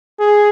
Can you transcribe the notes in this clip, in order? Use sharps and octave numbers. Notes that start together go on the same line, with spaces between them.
G#4